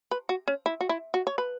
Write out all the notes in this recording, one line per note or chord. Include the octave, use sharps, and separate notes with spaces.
B4
F#4
C#4
E4
F#4
E4
F#4
C#5
B4